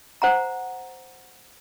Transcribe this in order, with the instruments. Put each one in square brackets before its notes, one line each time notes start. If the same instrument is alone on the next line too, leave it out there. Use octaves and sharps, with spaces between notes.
[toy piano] C5 F#5 A#5